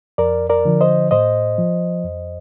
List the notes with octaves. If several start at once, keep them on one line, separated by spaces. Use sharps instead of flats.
F2 A#4 D5
A#4 D5
D3 F3
C5 D#5
A2 C5 D#5
F3
F2